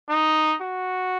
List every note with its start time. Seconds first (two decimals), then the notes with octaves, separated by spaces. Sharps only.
0.09 D#4
0.62 F#4